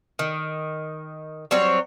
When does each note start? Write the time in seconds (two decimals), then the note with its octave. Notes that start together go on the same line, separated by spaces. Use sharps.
0.19 D#3
1.51 F#3 G3 C4 C#5